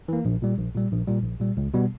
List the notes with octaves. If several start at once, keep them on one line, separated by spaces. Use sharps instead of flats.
E3 A#3
A#1
A#2 G3
A#1
A#2 G3
A#1
A#2 G3
A#1
A#2 G3
C#2
B2 G3 B3